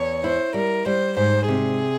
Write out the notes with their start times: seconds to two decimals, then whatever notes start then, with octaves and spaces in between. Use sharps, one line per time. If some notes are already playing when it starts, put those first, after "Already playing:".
Already playing: E2 C#5
0.23 E4 C5
0.54 G3 A#4
0.86 G3 C5
1.17 G#2 C5
1.48 C3 G#4